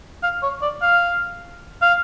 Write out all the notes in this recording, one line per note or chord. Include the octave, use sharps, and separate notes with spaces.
F5
C#5
D5
F5
F5